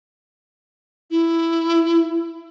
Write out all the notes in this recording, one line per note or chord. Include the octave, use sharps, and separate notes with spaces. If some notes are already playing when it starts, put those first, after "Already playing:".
E4